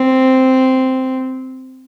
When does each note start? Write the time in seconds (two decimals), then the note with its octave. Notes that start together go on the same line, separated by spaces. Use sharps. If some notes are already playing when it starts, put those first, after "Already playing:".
Already playing: C4